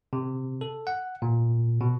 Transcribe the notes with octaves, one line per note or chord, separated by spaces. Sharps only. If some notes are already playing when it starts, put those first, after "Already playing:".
C3
A4
F#5
A#2
B2